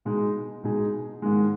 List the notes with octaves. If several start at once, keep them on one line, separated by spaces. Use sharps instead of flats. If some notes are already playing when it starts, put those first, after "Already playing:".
B2 G#3 D#4 G#4
B2 G#3 D#4 G#4
G#2 D#3 G#3